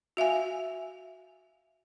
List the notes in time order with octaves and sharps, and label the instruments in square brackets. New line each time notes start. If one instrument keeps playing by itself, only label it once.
[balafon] F#4 E5 F5 G#5